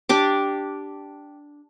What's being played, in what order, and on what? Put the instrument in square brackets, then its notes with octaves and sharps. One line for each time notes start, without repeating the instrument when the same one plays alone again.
[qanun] D4 G4 D6